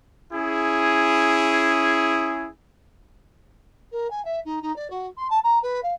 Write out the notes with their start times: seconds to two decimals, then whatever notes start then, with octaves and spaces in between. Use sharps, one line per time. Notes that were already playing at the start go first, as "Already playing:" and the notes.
0.32 C#4 E4 G#4
3.91 A#4
4.10 G#5
4.25 E5
4.45 D#4
4.62 D#4
4.76 D5
4.90 F#4
5.17 C6
5.30 A5
5.43 A#5
5.62 B4
5.83 F5